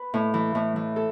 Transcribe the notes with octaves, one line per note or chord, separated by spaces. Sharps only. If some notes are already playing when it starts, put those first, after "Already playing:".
Already playing: B4
A2
E3
A2
E3
A4